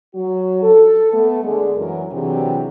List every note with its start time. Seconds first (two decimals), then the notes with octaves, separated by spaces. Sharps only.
0.15 F#3 F#4
0.63 A4
1.13 A3 B3 A4
1.44 D3 G#3
1.76 F#2 E3 F#3 A#4
2.13 C3 E3 F#3 D4 G4 G#4